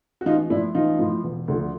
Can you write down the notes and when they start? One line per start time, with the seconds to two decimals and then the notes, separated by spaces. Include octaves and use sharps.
0.21 F#4
0.26 A1 D#4 F4
0.50 A2 D4 E4
0.54 F3
0.75 A1 D#4 F4
0.99 A2 F3
1.23 E1
1.48 D2 D3 F3